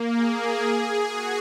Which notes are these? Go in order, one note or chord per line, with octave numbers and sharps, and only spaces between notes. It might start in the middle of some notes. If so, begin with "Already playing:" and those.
Already playing: A#3
G#4
F#4